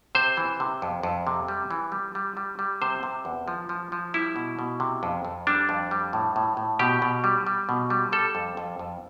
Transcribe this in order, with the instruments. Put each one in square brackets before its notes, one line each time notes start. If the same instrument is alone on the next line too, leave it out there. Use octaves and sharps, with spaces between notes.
[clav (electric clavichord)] C3 C5
E3
C3
F2
F2
C3
G3
E3
G3
G3
G3
G3
C3 C5
C3
E2
F3
F3
F3
G3 E4
B2
B2
C3
F2
F2
G3 D4
F2
G3
A2
A2
A2
B2 G4
B2
G3
G3
B2
G3
G3 A4
F2
F2
F2